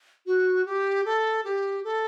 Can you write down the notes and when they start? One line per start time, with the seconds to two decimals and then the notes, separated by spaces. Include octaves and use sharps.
0.26 F#4
0.66 G4
1.05 A4
1.44 G4
1.84 A4